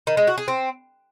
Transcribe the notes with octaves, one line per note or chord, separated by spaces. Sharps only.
D#3
G#3
F#4
G#4
C4